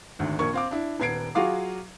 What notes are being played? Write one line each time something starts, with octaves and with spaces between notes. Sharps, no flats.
G#1 D2
A#1 A#3 C#6 G#6
C4 F5 D6
D4 E4
D#1 B3 G#6 C7 D7
F#3 F4 F#4 G#4 F5 D6